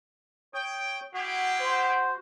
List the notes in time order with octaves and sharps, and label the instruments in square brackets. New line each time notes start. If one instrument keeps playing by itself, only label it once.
[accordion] C#5 D#6 [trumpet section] G5
[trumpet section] G#3 E4 G4 [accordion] F#4
[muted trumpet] C5